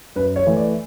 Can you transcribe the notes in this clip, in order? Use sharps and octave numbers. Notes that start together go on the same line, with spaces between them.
F#2 B4
C#5
E3 A3
D5